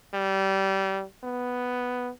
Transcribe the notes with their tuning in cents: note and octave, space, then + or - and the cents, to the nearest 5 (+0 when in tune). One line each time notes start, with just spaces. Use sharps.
G3 -25
B3 +5